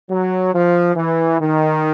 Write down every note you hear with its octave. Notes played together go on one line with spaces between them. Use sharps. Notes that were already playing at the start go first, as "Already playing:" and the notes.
F#3
F3
E3
D#3